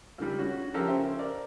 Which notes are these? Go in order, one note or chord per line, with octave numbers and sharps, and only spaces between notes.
C#2 D3 D#3 G3
C#4 F#4
F3 C#4 G4 A4 A#4
C#3 C5 E5 G5
A#4 D5